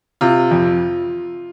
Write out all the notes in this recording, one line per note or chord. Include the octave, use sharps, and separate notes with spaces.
C3 F4
F2